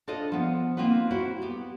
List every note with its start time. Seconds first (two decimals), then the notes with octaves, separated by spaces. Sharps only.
0.08 D4 F4 A4 C5 D#5
0.32 F3 B3
0.77 A#3 C4 D#4 F4 B4
1.11 E4 F#4 C5
1.42 B3 G4